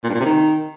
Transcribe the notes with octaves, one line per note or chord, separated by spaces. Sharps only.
A#2
G2
A#2
C3
D#3